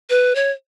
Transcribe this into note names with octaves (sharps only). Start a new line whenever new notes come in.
B4
C#5